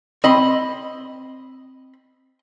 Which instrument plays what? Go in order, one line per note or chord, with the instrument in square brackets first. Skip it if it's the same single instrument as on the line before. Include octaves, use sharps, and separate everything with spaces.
[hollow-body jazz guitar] C4 B5 C6 [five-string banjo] D#5